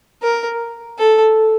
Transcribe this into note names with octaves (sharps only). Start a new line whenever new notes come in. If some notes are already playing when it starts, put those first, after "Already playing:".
A#4
A4